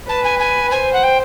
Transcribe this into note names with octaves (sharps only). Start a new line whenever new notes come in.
B4 A5
G#5
G#5
C5 G#5
F#5
G5